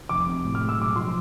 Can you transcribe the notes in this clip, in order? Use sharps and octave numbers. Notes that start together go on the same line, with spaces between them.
F1 D6
C3
A2
F6
G#3
E6
B1 D6
F3 C6